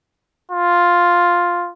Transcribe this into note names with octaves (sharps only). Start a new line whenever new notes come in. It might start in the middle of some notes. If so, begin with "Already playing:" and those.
F4